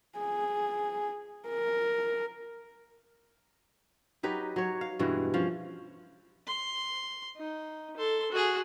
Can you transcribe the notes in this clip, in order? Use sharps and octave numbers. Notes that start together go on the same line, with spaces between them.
G#4
A#4
F#3 D#4 G4 B4
F#3 C#5
F5
G2 B2 E3 G#3
F3 C#4 F5
C6
D#4
A4 C6
F#4 G#4